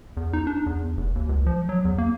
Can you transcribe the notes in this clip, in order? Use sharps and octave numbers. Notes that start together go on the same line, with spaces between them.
E2
D#4
D4
E2
F1
D#2
C#2
F3
F#3
E2
A#3